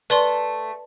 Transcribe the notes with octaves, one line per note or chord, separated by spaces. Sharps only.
A3 B4 D5 C6